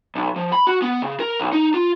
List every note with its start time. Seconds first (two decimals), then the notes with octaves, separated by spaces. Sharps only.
0.15 B1
0.36 F3
0.52 B5
0.67 F#4
0.82 B3
1.02 C#3
1.20 A#4
1.39 B1
1.52 D#4
1.74 F4